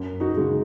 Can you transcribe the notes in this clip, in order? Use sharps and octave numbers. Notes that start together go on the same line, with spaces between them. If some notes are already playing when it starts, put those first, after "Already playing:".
Already playing: F#2
D#4 F#4
C#3 G#3